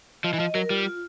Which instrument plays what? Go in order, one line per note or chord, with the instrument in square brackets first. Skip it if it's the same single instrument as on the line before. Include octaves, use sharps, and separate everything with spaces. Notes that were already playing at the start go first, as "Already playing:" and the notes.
[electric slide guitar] F3 [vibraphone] D#5
[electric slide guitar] E3
[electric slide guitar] F3 [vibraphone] D#5
[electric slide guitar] F#3 [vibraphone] A#4
[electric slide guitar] G3 [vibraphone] F4
[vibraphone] F4